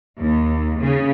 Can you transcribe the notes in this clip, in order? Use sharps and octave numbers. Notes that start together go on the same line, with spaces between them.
D#2
C#3